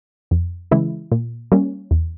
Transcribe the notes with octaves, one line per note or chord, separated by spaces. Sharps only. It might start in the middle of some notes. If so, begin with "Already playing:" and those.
F2
C#3 E3 G#3 E4
A#2
G3 A#3 C#4
E2